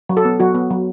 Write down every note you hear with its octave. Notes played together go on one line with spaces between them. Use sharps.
F#3
A4
B3
F#3 F#4
B3
F#3